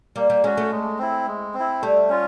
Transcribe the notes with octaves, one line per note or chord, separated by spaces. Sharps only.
G3 A#3
G3
G#3 C#4 F#4
A3
G#3
C4 E4
G#3
C4
E4
G3 A3
C#4 F4